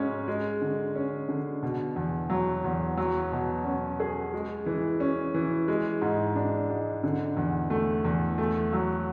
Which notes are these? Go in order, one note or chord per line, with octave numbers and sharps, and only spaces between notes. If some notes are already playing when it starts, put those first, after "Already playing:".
Already playing: G#2 G#3 C#4
G#3
D3
C#4
D3
B2
E2
F#3
E2
F#3
B2
C#4
G#4
G#3
E3
C#4
E3
G#3
G#2
D4
G#2
D3
E2
A3
E2
A3
F#3